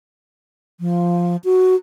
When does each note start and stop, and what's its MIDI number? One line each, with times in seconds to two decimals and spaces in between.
0.80 1.36 53
1.44 1.76 66